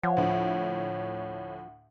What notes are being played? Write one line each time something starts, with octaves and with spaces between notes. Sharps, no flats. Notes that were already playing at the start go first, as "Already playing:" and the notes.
F3 C#5 F#5
D2 A2